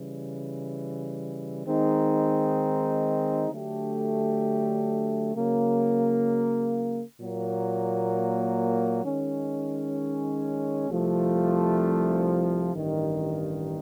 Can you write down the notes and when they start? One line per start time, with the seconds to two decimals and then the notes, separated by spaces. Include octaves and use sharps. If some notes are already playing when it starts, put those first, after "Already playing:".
Already playing: C#3 E3 G3
1.66 D#3 G#3 C4 D#4
3.51 D3 F#3 A3 D4 G4
5.35 C#3 F#3 A#3
7.19 A#2 F#3 A#3
9.04 D#3 G#3 C#4
10.88 C2 C3 F3 A3
12.73 A1 G2 D#3